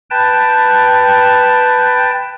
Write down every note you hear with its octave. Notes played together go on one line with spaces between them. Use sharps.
B4 G5 A5